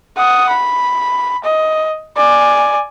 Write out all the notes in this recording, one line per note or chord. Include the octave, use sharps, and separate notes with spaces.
F#5 D#6
B5
D#5
D5 G#5